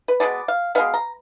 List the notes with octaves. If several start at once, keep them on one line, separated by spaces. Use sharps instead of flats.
B4
B2 G#3 B3 D5
F5
B2 G#3 B3 F5
A#5